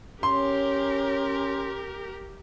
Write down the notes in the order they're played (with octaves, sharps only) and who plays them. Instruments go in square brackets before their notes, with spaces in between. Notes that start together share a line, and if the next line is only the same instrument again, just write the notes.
[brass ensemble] C#4 [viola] G4 A#4 [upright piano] C6